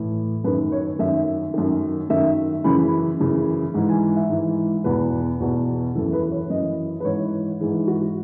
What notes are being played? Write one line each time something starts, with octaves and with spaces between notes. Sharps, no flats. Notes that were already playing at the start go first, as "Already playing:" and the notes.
Already playing: A2 E3
F#2 D#3 B4
C#5
F#2 D#3 E5
F#2 D#3
F#2 D#3 E5
F#2 C#3 E3 B5
F#2 C#3 E3
G#2 E3
G#5
E5
G#2 E3
E2 B2 B4
E2 B2
F#2 E3 A4
B4
C#5
F#2 E3 D#5
B4
G#2 E3 C#5
G#2 E3 G#4
F#4